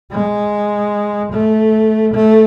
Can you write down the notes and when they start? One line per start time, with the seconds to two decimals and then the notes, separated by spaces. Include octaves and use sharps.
0.11 G#3
1.32 A3
2.14 A3